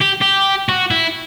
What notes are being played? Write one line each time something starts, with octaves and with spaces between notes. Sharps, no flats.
G4
G4
F#4
E4